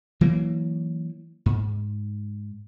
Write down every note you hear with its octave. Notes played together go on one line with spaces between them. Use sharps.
E3 F#3 A#3
G#2